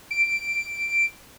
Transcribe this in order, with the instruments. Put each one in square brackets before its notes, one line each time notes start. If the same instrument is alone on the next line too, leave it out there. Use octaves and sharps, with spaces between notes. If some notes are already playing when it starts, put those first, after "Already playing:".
[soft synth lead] D7